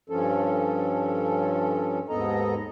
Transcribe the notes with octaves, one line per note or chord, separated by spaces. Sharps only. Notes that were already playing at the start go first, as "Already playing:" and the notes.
G2 F3 C#4 A4
D#2 G#2 B3 A4 D#5 A#5